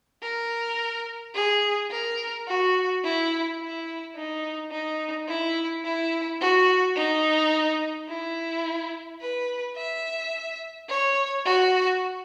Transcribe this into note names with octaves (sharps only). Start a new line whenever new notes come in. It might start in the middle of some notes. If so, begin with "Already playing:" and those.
A#4
G#4
A#4
F#4
E4
E4
D#4
D#4
E4
E4
F#4
D#4
E4
B4
E5
C#5
F#4